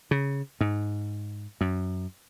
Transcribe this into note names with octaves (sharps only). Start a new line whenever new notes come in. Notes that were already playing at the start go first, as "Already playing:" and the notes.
C#3
G#2
F#2